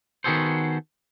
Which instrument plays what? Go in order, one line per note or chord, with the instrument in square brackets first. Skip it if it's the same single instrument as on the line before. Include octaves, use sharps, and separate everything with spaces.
[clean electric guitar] D#3 B3 F#4 G#4 A4 C5